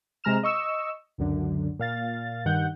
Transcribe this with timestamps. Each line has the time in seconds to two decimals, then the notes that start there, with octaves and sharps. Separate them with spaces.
0.24 C3 G#3 A#5 F6 E7
0.43 D#5 C#6 E6
1.18 C#2 F#2 D3
1.79 A#2 F5 A6
2.45 G2 D#3 F#5 G6